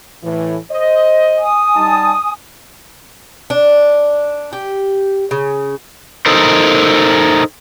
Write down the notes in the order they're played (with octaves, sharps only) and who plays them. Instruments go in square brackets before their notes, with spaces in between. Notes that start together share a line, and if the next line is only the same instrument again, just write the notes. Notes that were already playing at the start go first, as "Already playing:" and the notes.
[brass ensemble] A2 E3
C5 D#5
[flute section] G#5 D#6
[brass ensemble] G3 D#4 A5
[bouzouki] D4
G4
C#3
[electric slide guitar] D#4 A4 A#4 C5